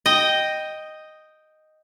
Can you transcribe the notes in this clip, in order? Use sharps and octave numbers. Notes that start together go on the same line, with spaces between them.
D#5 G5